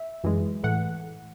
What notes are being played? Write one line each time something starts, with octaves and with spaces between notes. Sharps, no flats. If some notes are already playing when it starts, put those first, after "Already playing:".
Already playing: E5
F#2 E3 G#3
A2 E3 A3 F#5